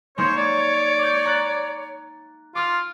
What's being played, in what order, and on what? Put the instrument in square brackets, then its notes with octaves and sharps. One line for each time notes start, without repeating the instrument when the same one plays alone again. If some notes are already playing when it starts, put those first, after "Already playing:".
[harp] G#3 A#3 D#4 [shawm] C5 [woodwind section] C#5
[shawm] D5
[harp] D6 G6
A#5 F#6 A6
[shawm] F4 [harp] D6 F6